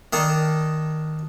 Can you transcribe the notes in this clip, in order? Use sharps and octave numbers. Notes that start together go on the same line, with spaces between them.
D#3 D4 D#4